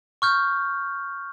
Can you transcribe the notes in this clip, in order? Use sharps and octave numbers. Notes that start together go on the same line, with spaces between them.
C#6 F6 G6